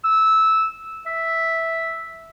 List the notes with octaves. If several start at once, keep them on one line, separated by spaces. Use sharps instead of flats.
E6
E5